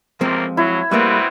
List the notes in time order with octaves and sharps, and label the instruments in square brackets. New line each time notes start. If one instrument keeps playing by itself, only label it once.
[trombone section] A1 C3 A#3 [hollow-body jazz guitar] F3 G#3 C4
[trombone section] F#3 [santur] E4
[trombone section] B2 C4 B4 [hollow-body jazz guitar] G3 A3 A#3 [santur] E5